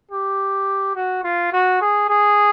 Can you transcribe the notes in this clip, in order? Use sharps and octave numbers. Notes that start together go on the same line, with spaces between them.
G4
F#4
F4
F#4
G#4
G#4